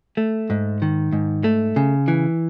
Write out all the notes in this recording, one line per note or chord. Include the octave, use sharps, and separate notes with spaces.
A3
G#2
D#3
G#2
A3
C#3
E3